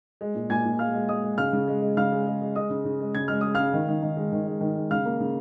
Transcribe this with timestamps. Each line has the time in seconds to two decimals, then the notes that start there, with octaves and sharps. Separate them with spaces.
0.21 G#3
0.35 A#2
0.50 A#2 G#5 G#6
0.65 A#2
0.79 G#3 F5 F6
0.94 G#3
1.08 G#3 D#5 D#6
1.24 G#3
1.38 C#3 F5 F6
1.53 C#3
1.68 G#3
1.82 G#3
1.96 C#3 F5 F6
2.12 G#3
2.27 G#3
2.41 G#3
2.56 G#3 D#5 D#6
2.70 C#3
2.85 C#3
3.00 G#3
3.15 C#3 G#6
3.28 G#3 F6
3.41 G#3 D#6
3.54 C#3 F5 F6
3.73 D#3
3.88 D#3
4.02 D#3
4.17 G#3
4.32 D#3
4.47 G#3
4.61 D#3
4.75 G#3
4.91 C#3 F5 F6
5.05 A#3
5.20 C#3